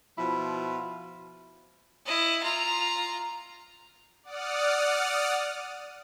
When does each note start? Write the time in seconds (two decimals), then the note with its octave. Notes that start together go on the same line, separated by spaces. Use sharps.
0.18 B2 F3 E4 F4
2.06 E4 D#5
2.43 F4 A#5
4.23 D5 F#5 D#6 F6